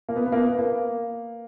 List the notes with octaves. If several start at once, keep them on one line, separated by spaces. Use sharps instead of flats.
A#3
B3
B3
A#3
B3
B3
A#3